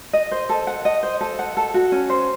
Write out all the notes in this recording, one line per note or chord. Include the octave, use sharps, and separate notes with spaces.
D#5
C5
A4
F#5
D#5
C5
A4
F#5
A4
F#4
C#4
C5